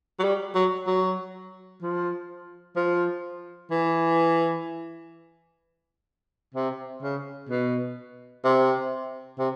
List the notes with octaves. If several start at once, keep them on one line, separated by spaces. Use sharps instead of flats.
F#3
G3
F#3
F#3
F3
F3
E3
C3
C#3
B2
C3
C3